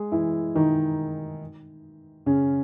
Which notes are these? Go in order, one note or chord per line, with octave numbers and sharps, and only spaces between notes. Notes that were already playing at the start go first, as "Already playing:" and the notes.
Already playing: G#3 G#4
E3 E4
D#3 D#4
C#3 C#4